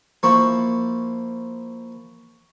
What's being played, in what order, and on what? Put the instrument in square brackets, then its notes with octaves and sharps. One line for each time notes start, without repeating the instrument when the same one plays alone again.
[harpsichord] F3 A#3 E4 [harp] C#6